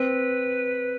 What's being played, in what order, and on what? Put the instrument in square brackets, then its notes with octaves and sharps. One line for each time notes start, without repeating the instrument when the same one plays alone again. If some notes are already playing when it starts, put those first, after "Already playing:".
Already playing: [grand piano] C4 [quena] B4